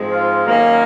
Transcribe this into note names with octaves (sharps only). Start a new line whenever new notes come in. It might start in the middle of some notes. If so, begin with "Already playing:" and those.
Already playing: G#2 F3 G#3 C4
F4
F#2 D#3 A#3 C#4